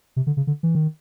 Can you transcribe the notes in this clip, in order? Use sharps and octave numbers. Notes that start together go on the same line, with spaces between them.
C3
D3
C#3
D3
E3
D#3